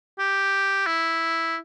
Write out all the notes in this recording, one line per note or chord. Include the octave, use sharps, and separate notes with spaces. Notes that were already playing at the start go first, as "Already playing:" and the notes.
G4
E4